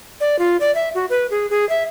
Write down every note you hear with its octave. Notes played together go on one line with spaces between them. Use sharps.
D5
F4
D5
E5
F#4
B4
G#4
G#4
E5